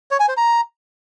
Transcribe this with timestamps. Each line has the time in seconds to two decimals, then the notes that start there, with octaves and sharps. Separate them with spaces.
0.11 C#5
0.20 G#5
0.28 C5
0.37 A#5